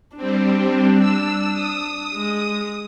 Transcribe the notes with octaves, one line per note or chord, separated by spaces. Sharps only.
G3 C4 D4
E6
D#6
G#3